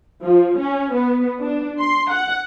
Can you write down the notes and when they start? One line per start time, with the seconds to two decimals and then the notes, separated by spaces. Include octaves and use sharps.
0.25 F3
0.60 C#4
0.94 B3
1.40 D4
1.78 C6
2.11 F#5